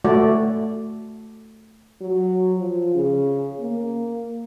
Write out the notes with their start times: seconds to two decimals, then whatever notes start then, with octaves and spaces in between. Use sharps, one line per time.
0.05 A3 F#4 D5
2.01 F#3
2.59 F3
2.95 C#3
3.60 A#3